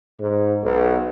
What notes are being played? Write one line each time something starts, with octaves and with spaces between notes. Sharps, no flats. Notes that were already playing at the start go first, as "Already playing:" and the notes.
G#2
B1